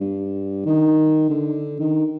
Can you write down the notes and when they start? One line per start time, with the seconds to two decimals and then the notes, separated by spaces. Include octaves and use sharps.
0.01 G2
0.66 D#3
1.30 D3
1.80 D#3